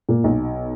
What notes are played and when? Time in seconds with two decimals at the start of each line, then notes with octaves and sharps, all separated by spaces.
0.09 A#2
0.24 B1 B2